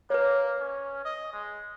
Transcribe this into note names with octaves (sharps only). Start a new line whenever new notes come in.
A#3 B4 C#5
C#4
D#5
G#3